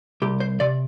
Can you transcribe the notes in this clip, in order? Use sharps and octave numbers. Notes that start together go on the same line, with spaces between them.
C2 G4
C5
C3 D5